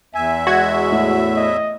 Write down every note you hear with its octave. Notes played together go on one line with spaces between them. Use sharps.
E2 E5 G#5
G#3 F#4 G#6
A2
D#5